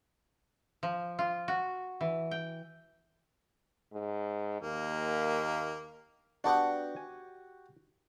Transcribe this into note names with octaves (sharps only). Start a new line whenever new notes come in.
F3
F4
F#4
E3
G5
G#2
D#2 A#3
B3 D4 F#4 G4 F#5
G#5